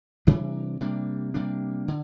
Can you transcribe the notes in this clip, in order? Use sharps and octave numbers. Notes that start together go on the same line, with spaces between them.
C3 E3 G3 D4
C3 G3 A#3 D4
C3 G3 A#3 D4
D3